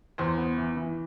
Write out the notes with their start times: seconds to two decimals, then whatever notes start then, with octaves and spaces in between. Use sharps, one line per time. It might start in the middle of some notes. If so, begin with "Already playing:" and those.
0.18 E2 C5
0.38 B3
0.57 E3
0.76 E3